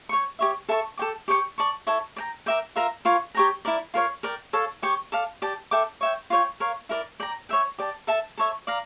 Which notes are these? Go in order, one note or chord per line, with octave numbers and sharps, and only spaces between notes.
C#5 G5 C#6
G4 C#5 E5
A4 E5 A5 C#6
A4 C#5 G5 D6
G4 C#5 G5 C#6
D5 A5 C#6
E4 A4 C#5
D5 G5 A#5
A#4 E5 G5 D6
F4 A#4 E5 A#5
F4 A#4 C#5
G4 C#5 G5 A#5
E4 A#4 D5
F4 A#4 C#5 F5
A#4 D5 G5
A4 C#5 F5
G4 C#5 G5 C#6
A4 D5 F5
G4 D5 A5
A4 E5 G5 D6
C#5 E5 G5
F4 C#5 G5
A#4 C#5 F5
E4 A#4 D5
D5 G5 A#5
C#5 E5 G5
G4 D5 A5
A4 E5 A5
A4 C#5 E5
D5 F5 A#5